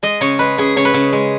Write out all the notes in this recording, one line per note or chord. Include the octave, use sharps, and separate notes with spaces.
G#3 D#5
C#3 C#5
G#3 B4
C#3 G#4
C#3 C#5
B4
C#3
G#3